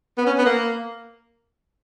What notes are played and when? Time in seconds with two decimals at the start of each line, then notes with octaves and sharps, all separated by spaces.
0.18 B3
0.26 C#4
0.38 B3
0.45 A#3